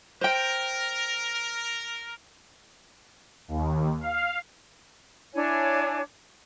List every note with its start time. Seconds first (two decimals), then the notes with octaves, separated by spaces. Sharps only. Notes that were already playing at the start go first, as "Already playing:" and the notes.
0.21 A#4 C5 G5
3.48 D#2
4.01 F5
5.34 D4 E4 C#5 G#5